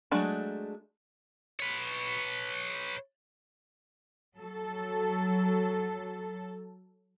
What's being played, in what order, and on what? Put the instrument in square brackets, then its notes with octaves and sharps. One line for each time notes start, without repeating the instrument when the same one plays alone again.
[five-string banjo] F#3 G#3 A3 D4
[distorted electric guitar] B4 C#5
[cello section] F#3 A4